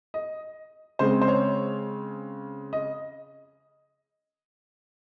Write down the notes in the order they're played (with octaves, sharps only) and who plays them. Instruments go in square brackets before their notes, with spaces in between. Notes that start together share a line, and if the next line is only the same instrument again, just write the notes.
[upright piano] D#5
C#3 G#3 C4 C5
C5
C#5
D#5